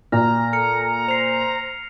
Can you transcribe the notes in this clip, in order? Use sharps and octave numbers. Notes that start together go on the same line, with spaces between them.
A#2 A#5 F6
A4 F6 C#7
C5 C7 F7